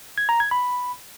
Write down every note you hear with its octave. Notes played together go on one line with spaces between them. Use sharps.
G#6
A#5
G#6
B5